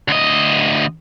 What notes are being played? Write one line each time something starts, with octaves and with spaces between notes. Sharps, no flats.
D2 D#5